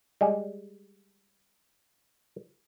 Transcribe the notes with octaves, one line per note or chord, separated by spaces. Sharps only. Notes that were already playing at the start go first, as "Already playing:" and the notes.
G3 G#3